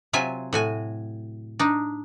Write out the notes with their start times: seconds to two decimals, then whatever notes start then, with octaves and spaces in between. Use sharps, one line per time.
0.13 C3 F#3 F4 E5 G#5
0.53 A2 F#4 G#5
1.59 D4 D#4